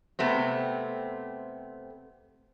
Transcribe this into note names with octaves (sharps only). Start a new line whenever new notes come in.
C3 A3 B3 C4